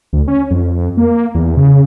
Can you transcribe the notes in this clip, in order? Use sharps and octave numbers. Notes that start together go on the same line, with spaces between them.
D2
C#4
F2
A#3
E2
C#3